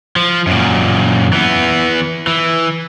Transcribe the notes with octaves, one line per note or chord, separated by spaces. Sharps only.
F3
F#2 A#2
E3 B3
E3